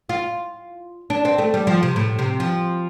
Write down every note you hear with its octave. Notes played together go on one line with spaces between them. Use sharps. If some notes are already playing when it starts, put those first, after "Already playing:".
F4
D4
C4
A3
G3
F3
C3
A2
C3
F3